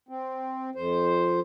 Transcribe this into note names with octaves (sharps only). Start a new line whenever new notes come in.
C4
F2 C5